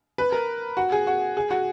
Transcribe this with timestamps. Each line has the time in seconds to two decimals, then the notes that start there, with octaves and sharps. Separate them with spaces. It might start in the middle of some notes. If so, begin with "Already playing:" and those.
0.18 B4
0.32 A#4
0.77 F#4
0.92 G#4
1.07 F#4
1.37 G#4
1.51 F#4